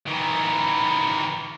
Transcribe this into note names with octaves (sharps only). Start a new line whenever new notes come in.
D#3 E3